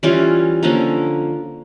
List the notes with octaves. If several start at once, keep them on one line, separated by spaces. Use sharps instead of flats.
E3 G3 C#4 F4
D3 F3 A#3 C#4